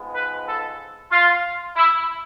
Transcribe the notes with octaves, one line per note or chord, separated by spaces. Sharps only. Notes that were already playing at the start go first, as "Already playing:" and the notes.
Already playing: G#2 F3 G#3 B3
B4
A4
F4
E4